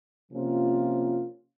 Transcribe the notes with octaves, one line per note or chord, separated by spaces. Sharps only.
C3 F3 A#3 C#4 F4